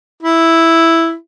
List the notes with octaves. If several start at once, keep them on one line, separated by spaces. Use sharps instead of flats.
E4